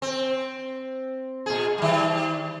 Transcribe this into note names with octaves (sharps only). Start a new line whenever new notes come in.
C4
A#2 G#4
D#3 G3